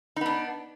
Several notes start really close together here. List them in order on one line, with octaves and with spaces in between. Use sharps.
D#4 B3 D4